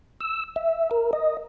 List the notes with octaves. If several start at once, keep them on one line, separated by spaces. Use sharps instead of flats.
E6
E5
A#4
D#5